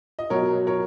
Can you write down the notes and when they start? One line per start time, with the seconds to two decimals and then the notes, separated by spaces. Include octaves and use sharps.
0.19 D#5
0.30 B2 F#3 A#4 C#5
0.67 A#4 C#5